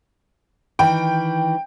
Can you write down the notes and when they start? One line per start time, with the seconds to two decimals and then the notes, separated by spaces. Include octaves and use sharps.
0.79 D#3 E3 G5